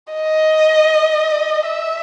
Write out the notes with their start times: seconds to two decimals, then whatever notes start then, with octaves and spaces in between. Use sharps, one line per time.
0.13 D#5
1.66 E5